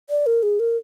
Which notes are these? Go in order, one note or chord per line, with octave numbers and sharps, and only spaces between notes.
D5
A#4
G#4
A#4